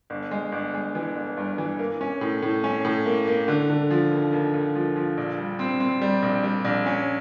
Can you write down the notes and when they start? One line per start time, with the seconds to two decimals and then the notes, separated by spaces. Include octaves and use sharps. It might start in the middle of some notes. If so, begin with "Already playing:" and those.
0.10 G1
0.31 G#3
0.52 G1
0.74 G#3
0.95 E3
1.16 G1
1.37 G2
1.58 E3
1.79 A#3
2.01 C#4
2.21 A2
2.42 A2
2.64 C#4
2.85 A2
3.06 A#3
3.27 A#3
3.48 D3
3.70 D3
3.90 F3
4.11 D#2
4.33 D#2
4.54 D#2
4.75 F3
4.96 F3
5.17 A#1
5.38 G3
5.59 C4
5.80 C4
6.01 G3
6.22 A#1
6.44 G3
6.65 A#1
6.86 C#4